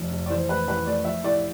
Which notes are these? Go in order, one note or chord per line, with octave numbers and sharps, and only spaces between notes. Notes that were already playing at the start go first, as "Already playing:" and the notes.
Already playing: F1 F2
F1
D5
E3 C5
A2 B4
A1 B4
A3 D5
F3 E5
A2 D5